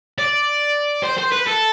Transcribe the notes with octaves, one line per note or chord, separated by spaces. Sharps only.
D5
C5
C5
B4
A4